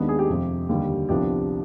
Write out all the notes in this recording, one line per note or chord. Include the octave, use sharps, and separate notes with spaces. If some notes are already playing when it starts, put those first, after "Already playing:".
Already playing: D#2 D#3 G#3 B3 D4
G#4
G4
F2 C3 F3
D#2 D3 G3
C2 C3 F3 B3 D4 G4